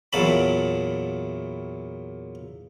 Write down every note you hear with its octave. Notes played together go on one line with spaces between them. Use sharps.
E2 A#2 F#3 A5 B5